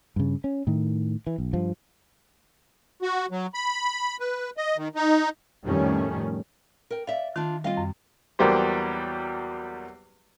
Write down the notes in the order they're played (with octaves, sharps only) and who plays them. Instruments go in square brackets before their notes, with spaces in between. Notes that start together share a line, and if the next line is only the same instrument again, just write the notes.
[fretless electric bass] G2 C#3
C#4
A2 D#3
E3
B1
G2 F3
[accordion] F#4
F#3
B5
B4
D#5
D#3
D#4
[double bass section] F2 A2 D#3 G3 A3 C#4
[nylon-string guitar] A#4 G5
[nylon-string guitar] D5 E5 [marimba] F5
[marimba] D#3 [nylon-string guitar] D4 F4
[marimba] G3 C4 [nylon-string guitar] F4 D#5 F5
[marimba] F#2
[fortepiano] E2 F#3 G3 A#3 G4 C5